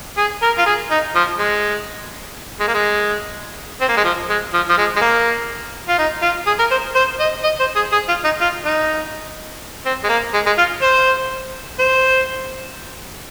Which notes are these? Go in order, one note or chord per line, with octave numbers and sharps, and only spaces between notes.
G#4
A#4
F4
G#4
D#4
F3
G#3
G#3
A#3
G#3
C4
A#3
G#3
F3
G#3
F3
F3
G#3
G#3
A#3
F4
D#4
F4
G#4
A#4
C5
C5
D#5
D#5
C5
G#4
G#4
F4
D#4
F4
D#4
C4
G#3
A#3
G#3
G#3
F4
C5
C5